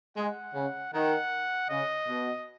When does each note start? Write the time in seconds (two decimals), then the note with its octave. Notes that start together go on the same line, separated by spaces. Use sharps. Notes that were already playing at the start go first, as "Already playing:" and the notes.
0.17 G#3 F#5
0.55 C#3
0.93 D#3 F#5
1.70 C#3 D#5
2.08 B2